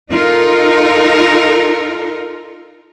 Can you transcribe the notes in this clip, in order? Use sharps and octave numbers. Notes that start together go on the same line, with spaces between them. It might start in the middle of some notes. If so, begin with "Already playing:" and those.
D#4 F4 A4 A#4